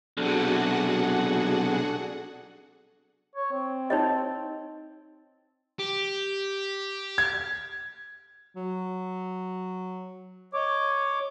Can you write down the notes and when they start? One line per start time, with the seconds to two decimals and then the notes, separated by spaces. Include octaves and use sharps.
0.17 B1 C3 D4 F#4 G#4 A4 F#5
3.36 C#5
3.53 C4
3.90 D#4 C#5 D#5
5.79 G4
7.18 G#6
8.55 F#3
10.54 C#5 D#5 D6